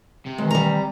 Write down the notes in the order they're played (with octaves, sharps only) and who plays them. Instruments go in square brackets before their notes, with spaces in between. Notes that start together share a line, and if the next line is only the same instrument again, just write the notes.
[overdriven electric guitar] C3
[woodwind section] D#3 E3 [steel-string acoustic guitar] G#3
[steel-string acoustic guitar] G3 A#5